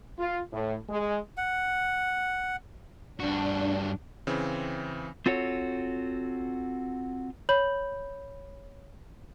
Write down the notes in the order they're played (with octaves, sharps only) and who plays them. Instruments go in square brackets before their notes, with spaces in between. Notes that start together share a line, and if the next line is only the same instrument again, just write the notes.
[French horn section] F4
A2
G#3
[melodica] F#5
[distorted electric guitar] G2 F#4 [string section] D4
[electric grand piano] C#3 E3 C4
[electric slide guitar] C4 F4 F#4 A4 C#5
[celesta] C#5 B5 G6 F#7